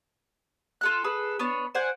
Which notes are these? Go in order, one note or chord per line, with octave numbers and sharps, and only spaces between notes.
F4 A4 F#6
G#4 A4 B4
B3 D4 C#5
C5 D5 F#5 G#5